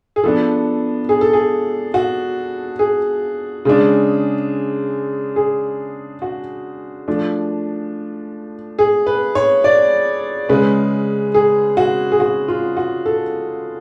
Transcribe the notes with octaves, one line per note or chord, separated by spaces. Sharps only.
G#4
F3 B3 D4 A4
G#4
A4
G#4
F#4
G#4
C#3 G#3 D4
G#4
F#4
F3 A3 D4
G#4
B4
C#5
D5
C#3 G#3 C#4 B4
G#4
F#4
G#4
F#4
F4
F#4
A4